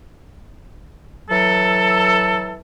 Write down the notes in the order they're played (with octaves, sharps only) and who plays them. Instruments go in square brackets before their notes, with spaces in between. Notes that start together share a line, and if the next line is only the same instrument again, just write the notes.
[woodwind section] E3 F#3 A4